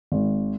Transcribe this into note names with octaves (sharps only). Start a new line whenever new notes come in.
G#1